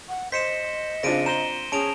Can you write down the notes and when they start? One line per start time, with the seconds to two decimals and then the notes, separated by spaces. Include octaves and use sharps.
0.09 F#5
0.32 C5 D#5 B6 C#7 E7
1.03 C#3 C4 D4 F4 A#6 D7 D#7
1.26 C5 A#5 E7 G7
1.72 C#4 G#4 A5 D7 F7